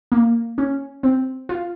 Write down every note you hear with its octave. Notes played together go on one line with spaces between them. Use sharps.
A#3
C#4
C4
F4